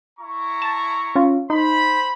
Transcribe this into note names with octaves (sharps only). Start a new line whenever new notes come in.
E4 A#5 C#6
A5
C#4 F4
D#4 C5 B5